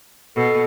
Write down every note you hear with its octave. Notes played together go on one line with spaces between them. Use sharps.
B2 A4